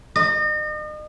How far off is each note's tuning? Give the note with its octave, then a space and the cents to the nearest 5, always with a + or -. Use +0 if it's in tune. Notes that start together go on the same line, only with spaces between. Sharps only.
D#5 -40